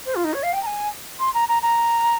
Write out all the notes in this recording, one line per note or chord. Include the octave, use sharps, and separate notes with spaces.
C5
F4
D#4
C#5
F5
G5
A#5
G#5
C6
A#5
A#5
A#5